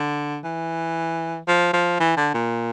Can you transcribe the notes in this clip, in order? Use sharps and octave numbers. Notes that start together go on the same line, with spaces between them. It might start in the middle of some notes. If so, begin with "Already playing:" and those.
Already playing: D3
E3
F3
F3
E3
D3
A#2